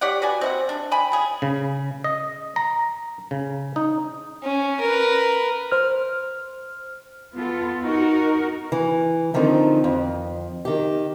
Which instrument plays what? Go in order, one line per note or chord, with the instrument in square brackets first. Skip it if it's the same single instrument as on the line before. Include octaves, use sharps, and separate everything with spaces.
[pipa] G4 C#5 D5 F#5
F#4 B4 D5 G#5
C4 E5 F#5
D4
G5 G#5 B5
C#3 G#4
[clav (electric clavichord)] C#3
D#5
A#5
C#3
D#4
[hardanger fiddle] C#4
A#4 B4
[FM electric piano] C5 F6
[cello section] B3 F4 A4
D#4 F#4 A#4
[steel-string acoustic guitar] E3
D3 D#3 F3 C4 D#4
F2
D#3 G4